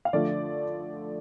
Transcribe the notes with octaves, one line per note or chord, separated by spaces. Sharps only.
F5
D3 F3 A3 D5